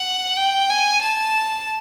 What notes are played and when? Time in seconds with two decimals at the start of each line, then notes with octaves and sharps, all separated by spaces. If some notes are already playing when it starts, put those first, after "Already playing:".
Already playing: F#5
0.37 G5
0.70 G#5
1.01 A5